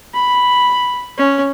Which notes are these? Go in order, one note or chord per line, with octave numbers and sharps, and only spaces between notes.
B5
C#4